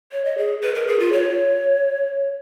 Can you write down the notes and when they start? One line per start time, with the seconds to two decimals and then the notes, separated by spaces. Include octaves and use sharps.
0.12 C#5
0.25 D#5
0.38 G#4
0.63 B4
0.75 A#4
0.87 G#4
0.99 F4
1.13 C#5